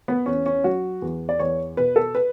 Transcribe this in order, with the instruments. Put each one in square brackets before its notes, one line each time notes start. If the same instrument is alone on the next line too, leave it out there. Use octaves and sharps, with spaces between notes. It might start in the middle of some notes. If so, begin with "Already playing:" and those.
[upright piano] B3
E2 C#4
C#4
F#3 F#4
E2
D5
E2 C#5
B2 B4
A4
B4